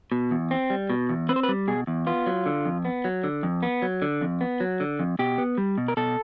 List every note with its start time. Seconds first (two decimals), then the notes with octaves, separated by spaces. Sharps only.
0.12 B2
0.31 E2
0.51 C4
0.70 G3
0.90 B2
1.09 E2
1.29 C4 B4
1.36 C5
1.43 B4
1.49 G3
1.68 B2 G#4
1.87 E2
2.07 B3 F4
2.26 F#3
2.46 D3
2.65 F2
2.85 B3
3.05 F#3
3.24 D3
3.43 F2
3.63 B3
3.82 F#3
4.02 D3
4.21 F2
4.41 B3
4.60 F#3
4.80 D3
4.99 F2
5.19 B2 G4
5.38 B3
5.58 G3
5.78 B2
5.88 A#4
5.97 B2 A4